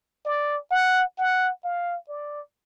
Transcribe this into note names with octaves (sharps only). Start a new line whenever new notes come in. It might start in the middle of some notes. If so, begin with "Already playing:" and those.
D5
F#5
F#5
F5
D5